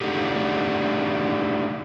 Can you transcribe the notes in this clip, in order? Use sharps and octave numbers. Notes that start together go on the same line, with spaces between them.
A3 D4 D#4 F#4 G4 A4